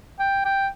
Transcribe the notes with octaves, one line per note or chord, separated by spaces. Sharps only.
G5
G5